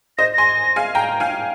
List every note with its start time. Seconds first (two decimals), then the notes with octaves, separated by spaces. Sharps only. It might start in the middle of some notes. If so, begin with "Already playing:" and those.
0.18 C5 D#5 A#6
0.33 G#5 C6 A#6
0.76 F5 G#5
0.95 G5 A#5
1.20 F5 G#5